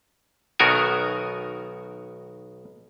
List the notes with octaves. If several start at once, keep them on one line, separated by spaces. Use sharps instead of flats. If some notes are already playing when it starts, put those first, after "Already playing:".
B1 B2 D#3 F#4 A#4 G#5